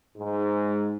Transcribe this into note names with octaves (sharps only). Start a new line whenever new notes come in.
G#2